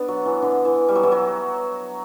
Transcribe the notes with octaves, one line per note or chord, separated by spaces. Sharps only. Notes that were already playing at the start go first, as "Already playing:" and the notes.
Already playing: B3 D4
F#3
E3
D3
E3
G3
F#3
E3
F#3